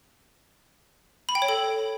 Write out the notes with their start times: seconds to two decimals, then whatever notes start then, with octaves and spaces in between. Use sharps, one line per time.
1.29 B5
1.35 G5
1.42 C#5
1.49 A4